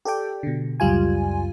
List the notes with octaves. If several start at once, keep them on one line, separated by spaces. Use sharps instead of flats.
G4 A4 D5 G5
B2 D3
C#2 F#2 G3 F4 G#5